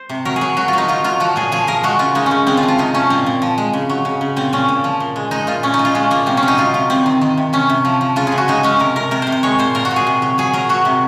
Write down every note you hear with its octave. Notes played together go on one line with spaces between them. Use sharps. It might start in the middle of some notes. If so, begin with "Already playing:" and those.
Already playing: C5
C3
F#3 A#4
G#4
F#3
F#3 F#4
F4
F#3 D#4
F#3 F4
F#3 F4
F3 F#4
A#2 G#4
F3 G#4
F3 A#4
G#3 F#4
C#3 F4
G#3 D#4
C#3 C#4
G#3 C4
F4
F3
F4
C3 D#4
F3 C#4
A#2 C4
A#2
F3
G#3
C#3
F#3
C#3
C#3
A#2 C4
A#2 C#4
A#2
F3
A#2
G#3
G#3 D#4
A#2 F4
A#2 C#4
D#4
A#2
F4
G#3 C#4
A#2 A#3
C3 C4
C#4
F#3
D#4
F#3 F4
C3 F4
C3 C4
D#3
D#3
C3
C3 C#4
C3
F3
F3
C#3 F4
G#4
C#3
F#4
G#3 D#4
G#3 C#4
C3 A#4
C3 A#4
C3 A#4
C3 C5
C5
G#3 C#5
A#2 C5
A#2 A#4
F#4
A#2
G#4
C3
F#3
F#3 G#4
F#3 A#4
F#3 F#4
C3